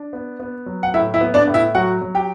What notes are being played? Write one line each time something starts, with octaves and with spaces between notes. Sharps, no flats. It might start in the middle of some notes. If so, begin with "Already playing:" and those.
Already playing: D4
B3
B3
F#3
F#5
A2 E4 E5
E4 E5
B3
D4 D5
A2
E4 E5
F#3 F#4 F#5
F#3
G4 G5